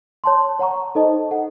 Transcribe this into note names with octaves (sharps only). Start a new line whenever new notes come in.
C#5 A5 C6
C#5 F#5 A#5 C#6
D#4 A4 C5 D#5 A5
A4 D#5 F#5